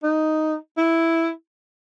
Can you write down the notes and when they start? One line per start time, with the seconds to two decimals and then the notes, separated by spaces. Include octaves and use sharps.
0.03 D#4
0.77 E4